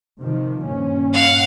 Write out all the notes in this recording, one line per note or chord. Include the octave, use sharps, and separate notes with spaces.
C3 D#3 F3
G2 A#2 C#4
F5 F#5